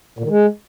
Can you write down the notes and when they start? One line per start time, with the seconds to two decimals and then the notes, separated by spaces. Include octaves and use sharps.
0.19 A#2
0.24 D#3
0.29 G#3